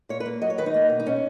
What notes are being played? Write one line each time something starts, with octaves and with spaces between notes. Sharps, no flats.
A#2 C#5
B4
A#3
F#3 D#5
C#5
D#3 B4
D#4
A#3
B2
D#4
B2 C#4